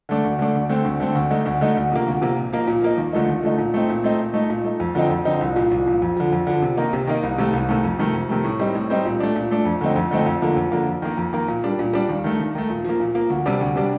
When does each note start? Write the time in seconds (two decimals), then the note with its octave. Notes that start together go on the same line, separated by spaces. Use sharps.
0.09 D3 A3 D4
0.24 D2
0.39 D3 A3 D4
0.55 D2
0.69 D3 A3 C4
0.85 D2
1.00 D3 A3 C4
1.15 D2
1.31 D3 A3 D#4
1.46 D2
1.61 D3 A3 D#4
1.76 D2
1.92 C3 F3 A#3
2.07 D2
2.21 C3 F3 A#3
2.37 A#2
2.53 F3 A#3 D#4
2.67 A#2
2.82 F3 A#3 D#4
2.97 D#2
3.13 D3 F3 A3 D#4
3.28 D#2
3.43 D3 F3 A3 D#4
3.58 A#2
3.74 A3 C4 D#4
3.89 A#2
4.04 A3 C4 D#4
4.19 A#2
4.34 A3 D#4
4.50 A#2
4.65 A3 D#4
4.80 F2
4.95 D3 F3 C4 D#4
5.10 F2
5.25 D3 F3 C4 D#4
5.41 C2
5.56 A#2 F3
5.71 C2
5.86 A#2 F3
6.02 F2
6.17 D3 F3
6.32 F2
6.47 D3 F3
6.62 C3
6.77 D#3 A#3 D#4
6.93 C3
7.07 D#3 A#3 D#4
7.23 C2
7.38 C3 D#3 A3
7.53 C2
7.69 C3 D#3 A3
7.84 F2
7.99 C3 D#3 A3
8.14 F2
8.29 C3 D#3 A3
8.44 A2
8.59 G3 C4 D#4
8.75 A2
8.90 G3 C4 D#4
9.05 A#2
9.20 A3 D4
9.36 A#2
9.51 A3 D4
9.65 F2
9.81 D3 A3 C4 D#4
9.96 F2
10.11 D3 A3 C4 D#4
10.26 F2
10.42 D3 F3 A#3
10.56 F2
10.72 D3 F3 A#3
10.87 F2
11.02 D#3 A#3
11.17 F2
11.33 D#3 A#3
11.48 A#2
11.64 G3 D4
11.79 A#2
11.93 G3 D4
12.09 D#2
12.24 D#3 A3
12.40 D#2
12.55 D#3 A3
12.70 A#2
12.84 F3 A#3
13.00 A#2
13.15 F3 A#3
13.30 D2
13.46 C3 G3 D4
13.61 D2
13.76 C3 G3 D4